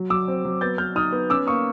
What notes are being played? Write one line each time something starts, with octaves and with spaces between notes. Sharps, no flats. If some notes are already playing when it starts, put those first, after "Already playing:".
Already playing: F#3
F#3 D6 E6
C4
F#3
B3 G6 A6
B3 F6 G6
D#4 D#6 F6
B3
C#4 D6 E6
A#3 C#6 D#6